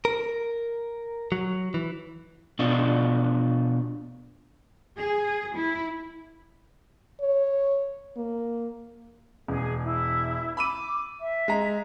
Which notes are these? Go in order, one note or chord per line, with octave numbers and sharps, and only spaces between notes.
A#4
F#3
E3
B2 D4 F4
G#4
E4
C#5
A#3
E1 G#4
E4
B5 D6 E6 D#7
E5
G#3 A#5